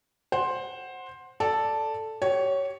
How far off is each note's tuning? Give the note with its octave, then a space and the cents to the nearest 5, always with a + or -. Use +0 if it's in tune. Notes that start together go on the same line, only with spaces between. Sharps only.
C5 +10 F#5 +0
A4 +0 D5 +0 A5 +0
G4 -30 C#5 +0